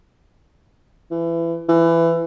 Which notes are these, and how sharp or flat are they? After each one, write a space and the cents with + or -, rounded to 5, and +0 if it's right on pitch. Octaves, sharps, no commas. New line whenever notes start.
E3 +25
E3 +20